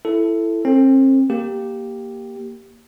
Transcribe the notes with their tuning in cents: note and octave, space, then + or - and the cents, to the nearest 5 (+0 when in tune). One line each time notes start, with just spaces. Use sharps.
E4 +15 A4 +0
C4 +35 A4 +35
A#3 +0 G4 +0